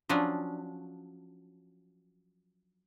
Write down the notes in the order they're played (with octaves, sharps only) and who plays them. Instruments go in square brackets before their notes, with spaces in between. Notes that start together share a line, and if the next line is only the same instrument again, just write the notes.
[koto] F3 F#3 C#4 D4